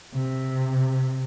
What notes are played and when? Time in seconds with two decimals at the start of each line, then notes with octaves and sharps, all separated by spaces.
0.15 C3